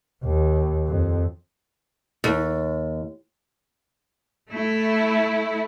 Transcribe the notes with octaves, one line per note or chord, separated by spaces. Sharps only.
D#2
F2
D#2
A3 E4